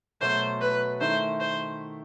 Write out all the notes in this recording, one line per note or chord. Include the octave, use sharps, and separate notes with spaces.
B2 F#3 A3 C5
B4
D#3 A3 E4 C5
C5